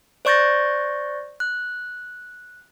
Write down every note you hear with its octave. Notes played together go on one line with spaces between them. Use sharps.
C5 D5 C#6 G6 A6 A#6
F#6